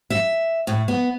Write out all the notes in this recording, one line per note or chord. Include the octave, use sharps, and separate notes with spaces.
E5
A2
B3